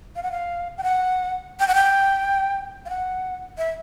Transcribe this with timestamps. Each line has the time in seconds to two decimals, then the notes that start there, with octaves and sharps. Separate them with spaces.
0.16 F5
0.23 F#5
0.32 F5
0.78 G5
0.83 F#5
1.60 G5
1.68 F#5
1.75 G5
2.86 F5
2.90 F#5
3.58 E5